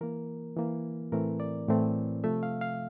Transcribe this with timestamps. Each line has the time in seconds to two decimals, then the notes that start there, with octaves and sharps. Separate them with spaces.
0.01 E3 A#3 A#4
0.57 E3 A#3
1.12 A2 E3 A3 C4 A#4
1.40 D5
1.68 A2 E3 A3 C4
2.24 C3 F3 A3 E5
2.43 F5
2.61 F5